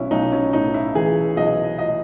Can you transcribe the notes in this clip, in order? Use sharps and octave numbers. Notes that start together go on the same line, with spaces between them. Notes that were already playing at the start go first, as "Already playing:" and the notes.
Already playing: B1 C#4 E4
B1 D#4
C#4
A2 D#4
E4
E3 G#4
B1 D#5
D#5